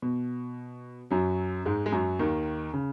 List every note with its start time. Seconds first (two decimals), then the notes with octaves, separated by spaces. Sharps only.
0.02 B2
1.10 F#2 F#3
1.65 G#2 G#3
1.86 G#3
1.92 F#2 F#3
2.19 D#2 D#3
2.74 C#3